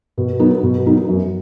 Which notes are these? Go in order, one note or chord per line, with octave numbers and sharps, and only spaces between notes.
B2
F#3 B3 D#4
B2
F#3 B3 D#4
F#2